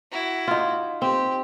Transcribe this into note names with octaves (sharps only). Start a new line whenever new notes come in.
E4 F#4
D#4 F4
C4 G4